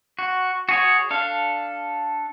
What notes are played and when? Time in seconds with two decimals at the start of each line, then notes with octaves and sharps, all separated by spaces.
0.19 F#4
0.69 F#4 G#4 C#5
1.11 D4 A4 F5